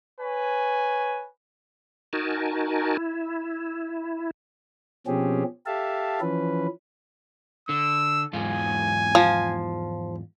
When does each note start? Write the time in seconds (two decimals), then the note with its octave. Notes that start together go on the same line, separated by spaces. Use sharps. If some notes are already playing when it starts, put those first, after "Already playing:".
0.21 B4 C#5 G#5
2.13 D#4 F#4 A#4 G#5 A5
2.97 E4
5.07 B2 F3 C4 C#4 G4 G#4
5.66 G4 A4 E5 F5 A5
6.21 E3 F3 C#4 B4
7.69 D3 E6
8.33 E2 G#2 F4 G#5
9.15 F3